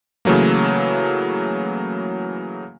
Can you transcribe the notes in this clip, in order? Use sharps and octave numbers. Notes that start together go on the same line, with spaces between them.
C#3 E3 F#3 A3 A#3